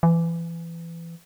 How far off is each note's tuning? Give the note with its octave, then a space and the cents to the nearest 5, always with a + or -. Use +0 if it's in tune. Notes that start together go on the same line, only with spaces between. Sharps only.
E3 +25